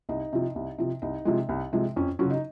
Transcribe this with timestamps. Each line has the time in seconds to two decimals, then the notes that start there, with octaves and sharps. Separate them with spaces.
0.09 C2 D#4
0.33 C3 F3
0.56 C2
0.78 C3 F3
1.02 C2 D#4
1.25 C3 F3 G#3
1.49 C2
1.73 C3 F3 G#3
1.96 F2 C#4
2.19 C#3 F#3 C#4 F4
2.31 D#4